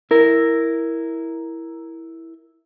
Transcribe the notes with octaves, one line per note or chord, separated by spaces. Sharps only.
E4 A#4